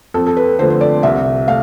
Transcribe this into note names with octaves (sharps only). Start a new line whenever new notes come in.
F2 A4
A4
B4
D3 F3 A3 C5
C5
D5
C2 E5
A3 F5